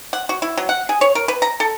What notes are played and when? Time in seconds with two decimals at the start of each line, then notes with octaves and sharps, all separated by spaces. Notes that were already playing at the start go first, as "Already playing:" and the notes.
0.13 F#5
0.29 F#4
0.42 E4
0.57 F#3
0.69 F#5
0.89 G#4
1.01 C#5
1.15 A#4
1.28 B4
1.42 A#5
1.60 A4